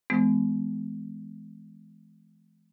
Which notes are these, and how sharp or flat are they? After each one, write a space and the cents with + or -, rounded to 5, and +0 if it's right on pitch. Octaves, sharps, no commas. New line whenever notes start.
E3 +0 G#3 +30 B3 +40